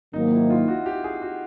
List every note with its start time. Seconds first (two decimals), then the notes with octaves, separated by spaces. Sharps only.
0.13 G#2 D#3 F#3 A#3 D#4
0.32 E4
0.50 F4
0.68 F#4
0.86 G4
1.04 G#4
1.22 F#4